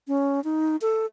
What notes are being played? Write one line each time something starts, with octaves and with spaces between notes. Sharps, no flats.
C#4
D#4
A4